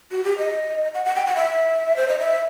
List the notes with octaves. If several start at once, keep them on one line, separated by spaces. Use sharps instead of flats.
F#4
G4
D#5
F#5
F#5
G5
F#5
E5
C5
D#5
E5